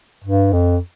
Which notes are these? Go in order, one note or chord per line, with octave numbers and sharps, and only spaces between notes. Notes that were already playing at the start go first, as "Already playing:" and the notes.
G2
F2